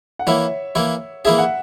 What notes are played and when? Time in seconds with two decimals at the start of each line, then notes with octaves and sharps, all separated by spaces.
0.19 F#5
0.27 E3 A#3 E4 C#5 E5
0.75 E3 A#3 E4
1.25 E3 A#3 E4 G#4 E5
1.38 F#5